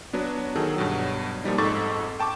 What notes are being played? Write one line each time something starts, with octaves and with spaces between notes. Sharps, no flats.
F#3 B3 D4
D#3 F#3 G#4 A4
G2 B2 F#3
A#2 F3 G3 D#4
F2 G#2 A4 C#6 D6 A6
G5 A5 C#6 D6